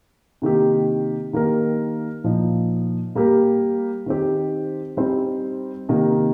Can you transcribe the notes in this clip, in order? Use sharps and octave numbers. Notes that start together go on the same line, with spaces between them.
C3 D#3 A#3 G4
D#3 A#3 G4 A#4
A#2 F3 D#4
G3 A#3 G4 A#4
D#3 C4 D#4 G4 C5
G3 C4 D#4 C5
C3 D#3 A#3 D#4